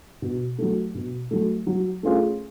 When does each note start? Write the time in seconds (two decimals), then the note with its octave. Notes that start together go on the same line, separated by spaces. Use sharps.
0.22 B2
0.59 F#3 A3
0.95 B2
1.31 F#3 A3
1.67 F#3
2.03 A3 C#4 F4 G#4